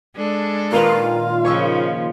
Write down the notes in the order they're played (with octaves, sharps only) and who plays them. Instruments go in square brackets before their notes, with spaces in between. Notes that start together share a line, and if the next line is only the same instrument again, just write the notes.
[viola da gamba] G#3 D4 A4
[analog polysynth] A#2 D#3 F4 [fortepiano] A#3 A#4 B4 [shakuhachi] F5
[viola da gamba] C#3 F3 [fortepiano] C#5 C#6 E6